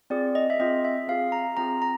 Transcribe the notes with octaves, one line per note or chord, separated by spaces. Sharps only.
C4 F4 G#4 D5
D#5
E5
C4 F4 G#4 D#5
E5
C4 F4 G#4 F5
A#5
C4 F4 G#4 A#5
A#5